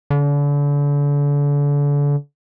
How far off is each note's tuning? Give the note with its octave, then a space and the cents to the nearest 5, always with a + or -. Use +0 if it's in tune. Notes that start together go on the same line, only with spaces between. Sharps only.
D3 -35